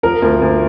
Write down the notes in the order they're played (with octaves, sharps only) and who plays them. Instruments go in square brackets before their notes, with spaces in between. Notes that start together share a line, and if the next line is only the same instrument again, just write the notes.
[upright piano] F3 [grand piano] A#4
[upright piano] D2
D2